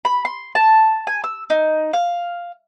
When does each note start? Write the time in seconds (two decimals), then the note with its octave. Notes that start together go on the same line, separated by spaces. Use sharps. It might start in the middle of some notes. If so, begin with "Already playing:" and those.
0.05 B5
0.25 C6
0.55 A5
1.07 G#5
1.24 E6
1.50 D#4
1.93 F5